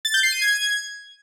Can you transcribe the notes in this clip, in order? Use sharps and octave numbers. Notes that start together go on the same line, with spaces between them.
A6
G6
C7
D#7
G#6